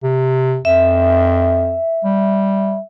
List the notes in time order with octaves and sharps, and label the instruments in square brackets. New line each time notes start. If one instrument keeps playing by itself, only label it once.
[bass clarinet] C3
[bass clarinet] F2 [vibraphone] E5
[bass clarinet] G3